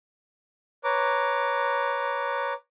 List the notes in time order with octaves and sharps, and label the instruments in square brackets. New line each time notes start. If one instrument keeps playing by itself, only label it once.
[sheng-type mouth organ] B4 C#5 A#5 D6